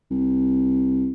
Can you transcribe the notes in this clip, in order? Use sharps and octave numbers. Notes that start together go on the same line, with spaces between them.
C2